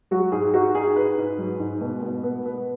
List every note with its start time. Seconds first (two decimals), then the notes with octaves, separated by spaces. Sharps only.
0.11 F#3 F#4
0.32 G#2 G#4
0.54 D#4 F#4
0.75 D#4 G#4
0.96 G#2 B4
1.18 G#2
1.38 F#3
1.59 G#2
1.81 B2
2.03 B2
2.23 B3
2.46 B3